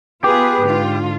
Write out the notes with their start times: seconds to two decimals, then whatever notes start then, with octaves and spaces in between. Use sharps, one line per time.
0.24 B3 F4 G4 G#4 B4
0.61 G#2 D3 F4